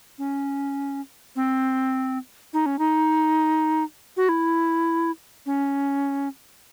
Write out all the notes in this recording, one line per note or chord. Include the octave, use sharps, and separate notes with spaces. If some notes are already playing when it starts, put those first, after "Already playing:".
C#4
C4
D#4
C#4
D#4
F#4
E4
C#4